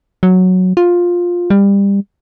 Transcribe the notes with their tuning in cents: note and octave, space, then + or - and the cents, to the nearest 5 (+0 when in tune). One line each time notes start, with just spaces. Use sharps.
F#3 -5
F4 +10
G3 +25